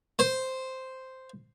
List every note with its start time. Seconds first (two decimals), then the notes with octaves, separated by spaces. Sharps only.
0.19 C5